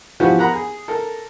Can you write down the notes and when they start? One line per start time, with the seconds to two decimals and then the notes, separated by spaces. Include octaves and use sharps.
0.20 E3 F3 B3 F#4 G4 B4
0.38 A#4 F#5 A#5 B5
0.53 G#4
0.88 A4 A#4